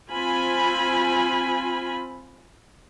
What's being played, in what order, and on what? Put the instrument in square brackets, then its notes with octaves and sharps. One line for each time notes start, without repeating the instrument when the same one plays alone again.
[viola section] C4 F4 G#5 B5